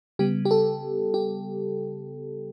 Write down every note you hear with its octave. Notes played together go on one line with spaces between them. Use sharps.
C#3 G3 B3 G4
G4
A4
G4